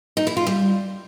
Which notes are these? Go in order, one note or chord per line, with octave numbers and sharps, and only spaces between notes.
D#4
E4
F4
G3